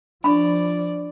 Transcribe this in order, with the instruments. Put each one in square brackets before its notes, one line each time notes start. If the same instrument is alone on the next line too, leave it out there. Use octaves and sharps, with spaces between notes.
[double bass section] F3 [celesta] D4 [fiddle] D5 [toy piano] B5 C#6